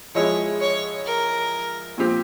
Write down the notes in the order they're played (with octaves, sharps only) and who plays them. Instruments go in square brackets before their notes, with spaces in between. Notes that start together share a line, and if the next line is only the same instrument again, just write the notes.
[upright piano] F3 G#3 E4 [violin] C#5
[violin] C#5
A#4
[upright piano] A#2 F3 C4 G4